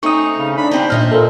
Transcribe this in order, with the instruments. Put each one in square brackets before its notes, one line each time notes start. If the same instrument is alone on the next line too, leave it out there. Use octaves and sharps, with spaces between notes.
[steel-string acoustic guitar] A3 C4 C#4 [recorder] D#4 [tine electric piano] C#6 D#6
[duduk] C#3
[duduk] D4 [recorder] B5
[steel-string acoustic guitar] G3 C4 D#4 [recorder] C5
[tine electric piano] A#2 F6 [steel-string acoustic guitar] D#4 D#5 E5
[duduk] A#2 [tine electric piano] A4 A#4